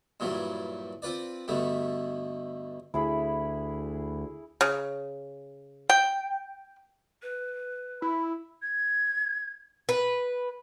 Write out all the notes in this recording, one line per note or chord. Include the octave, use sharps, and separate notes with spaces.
G2 A#2 E3 F#3 G3
C4 F4 B4 D5
G2 B2 D3 A3
D2 E4 G#4 B5
C#3
G5
B4
E4 B5
G#6
B4